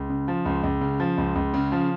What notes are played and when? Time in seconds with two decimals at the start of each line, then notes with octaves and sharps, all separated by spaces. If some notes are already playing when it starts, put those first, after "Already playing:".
Already playing: C#2
0.10 C#3
0.28 F3
0.45 C#2
0.63 C#2
0.81 C#3
1.00 F3
1.18 C#2
1.35 C#2
1.54 C#3
1.72 F3